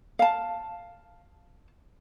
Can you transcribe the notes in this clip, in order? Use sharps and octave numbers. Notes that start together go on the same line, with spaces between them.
F5 A5